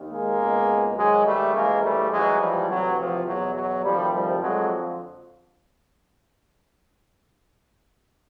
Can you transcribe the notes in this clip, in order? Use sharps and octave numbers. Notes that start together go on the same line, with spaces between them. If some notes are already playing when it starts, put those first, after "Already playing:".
Already playing: D#2 D#3
G#3 A#3
C#2 B2
G#2 D#3 F#3 G#3
G3 A3
D2 C#3 E3 G#3 A#3
G3 A3
G#2 E3 F#3 G#3
F3 G3
D2 C3 E3 F#3
F3
E2 B2 F#3
F#3
D2 C3 D#3 F3 G3
F3 G3
F2 D3 F3 F#3 G#3